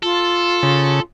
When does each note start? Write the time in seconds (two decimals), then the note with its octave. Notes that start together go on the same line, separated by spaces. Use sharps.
0.03 F4 A4
0.63 C#3